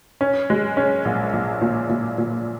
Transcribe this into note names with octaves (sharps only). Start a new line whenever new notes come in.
C#4
G#3
C#4
A#1
A#1
A#2
A#2
A#2